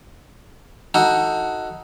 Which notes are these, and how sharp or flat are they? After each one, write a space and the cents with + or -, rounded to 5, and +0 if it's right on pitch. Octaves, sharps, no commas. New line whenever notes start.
D#4 +20 F#4 +0 A4 +20